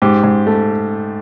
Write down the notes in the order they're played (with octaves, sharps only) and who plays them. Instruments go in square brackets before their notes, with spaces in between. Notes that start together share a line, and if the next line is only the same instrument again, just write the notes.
[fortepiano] G#2 G4
G#2
A3